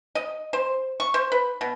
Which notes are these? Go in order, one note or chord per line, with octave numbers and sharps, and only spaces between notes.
D#5
C5
C#6
C5
B4
B2